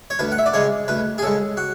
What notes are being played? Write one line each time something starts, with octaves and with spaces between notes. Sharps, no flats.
C#5
D2 B4
F#5
E5
D5
C#3 G#3 C#5
D2 B4
G#4
C#3 G#3 A4
F#4